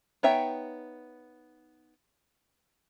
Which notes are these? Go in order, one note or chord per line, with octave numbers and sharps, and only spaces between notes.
B3 D#4 C#5 E5 G5